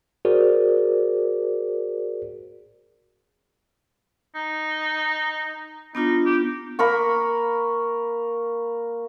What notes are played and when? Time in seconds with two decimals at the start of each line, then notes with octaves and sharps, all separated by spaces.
0.25 F#4 G#4 A#4 C5 D5
4.35 D#4
5.95 B3 D4 D#4 F4
6.26 G4
6.79 A#3 A#4 B5 C#6